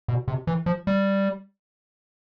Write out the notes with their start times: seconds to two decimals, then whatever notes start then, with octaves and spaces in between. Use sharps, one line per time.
0.08 B2
0.28 C3
0.47 E3
0.66 F3
0.87 G3